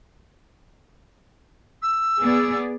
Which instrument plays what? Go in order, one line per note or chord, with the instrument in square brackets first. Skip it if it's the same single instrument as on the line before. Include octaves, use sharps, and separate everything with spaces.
[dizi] E6
[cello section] B3 G#4 D5